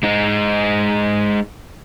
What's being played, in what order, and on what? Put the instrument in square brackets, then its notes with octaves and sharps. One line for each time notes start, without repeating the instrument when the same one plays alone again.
[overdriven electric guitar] G#3 D#4